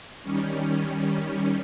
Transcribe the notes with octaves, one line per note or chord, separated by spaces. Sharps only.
D#3 G3 C#4